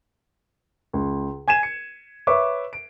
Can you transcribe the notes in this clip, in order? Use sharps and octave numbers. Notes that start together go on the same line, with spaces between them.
C#2
G#5 G#6 D#7 E7
C#7
B4 C#5 E5 C#6 D6
D7